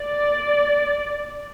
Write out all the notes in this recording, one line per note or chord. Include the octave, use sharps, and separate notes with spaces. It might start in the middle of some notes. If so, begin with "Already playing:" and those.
Already playing: D5